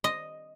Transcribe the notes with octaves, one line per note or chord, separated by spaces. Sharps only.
D#5